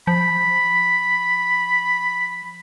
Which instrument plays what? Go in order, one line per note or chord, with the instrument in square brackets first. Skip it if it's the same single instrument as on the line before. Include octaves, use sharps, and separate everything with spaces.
[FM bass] F3 [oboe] B5